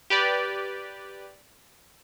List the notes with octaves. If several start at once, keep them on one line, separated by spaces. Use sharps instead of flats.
G4 B4 D5